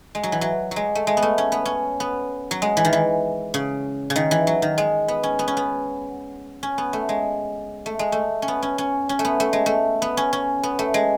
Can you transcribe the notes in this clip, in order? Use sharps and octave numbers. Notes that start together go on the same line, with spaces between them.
G#3
F#3
E3
F#3
F#3
G#3
A3
G#3
B3
A3
C#4
B3
C#4
B3
F#3
G#3
E3
D#3
E3
C#3
C#3
D#3
E3
F#3
D#3
G#3
B3
C#4
B3
C#4
B3
C#4
B3
A3
G#3
A3
G#3
A3
C#4
B3
C#4
C#4
C#4
A3
B3
A3
G#3
A3
B3
C#4
C#4
B3
A3
G#3